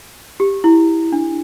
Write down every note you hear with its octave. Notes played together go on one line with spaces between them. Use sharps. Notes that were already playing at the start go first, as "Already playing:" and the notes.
G4
E4
D4